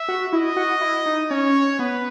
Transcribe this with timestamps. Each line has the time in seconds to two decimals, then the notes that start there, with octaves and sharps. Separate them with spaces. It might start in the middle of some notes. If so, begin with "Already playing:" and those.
Already playing: E5
0.08 F#4
0.33 E4 D#5
0.57 F#4
0.81 E4
1.06 D#4
1.31 C#4 C#5
1.79 B3 B4